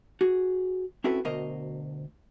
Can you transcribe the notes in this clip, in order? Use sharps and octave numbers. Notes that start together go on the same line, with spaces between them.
F#4 G#4
C4 C#4 E4 F#4 A4 B4
D2 B2 A#4 C5 D#5